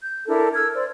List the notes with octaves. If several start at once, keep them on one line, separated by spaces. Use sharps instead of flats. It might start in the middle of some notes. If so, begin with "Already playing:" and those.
G6
D4 E4 A4 A#4
E6 F6 G#6
C5 D5